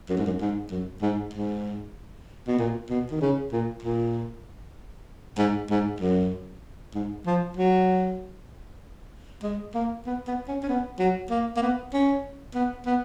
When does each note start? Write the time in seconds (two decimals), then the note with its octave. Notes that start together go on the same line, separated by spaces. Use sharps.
0.09 F#2
0.17 G#2
0.26 F#2
0.41 G#2
0.71 F#2
1.02 G#2
1.34 G#2
2.47 B2
2.59 A#2
2.90 B2
3.11 D#3
3.21 C#3
3.52 A#2
3.82 A#2
5.38 G#2
5.70 G#2
6.00 F#2
6.94 G#2
7.26 F3
7.57 F#3
9.43 G#3
9.75 A#3
10.06 B3
10.27 B3
10.48 C#4
10.63 C#4
10.69 B3
10.99 F#3
11.30 A#3
11.56 A#3
11.62 B3
11.93 C#4
12.55 B3
12.86 B3